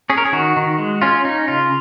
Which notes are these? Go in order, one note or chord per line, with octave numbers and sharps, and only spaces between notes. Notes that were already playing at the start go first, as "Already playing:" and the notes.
C#4 G#4
A#4
G#4
D#3 F#4
D#3
G#3
C#4 F4
C#4 D#4
C#3 F4